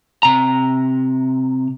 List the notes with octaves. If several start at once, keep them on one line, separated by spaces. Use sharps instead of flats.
C3 A#5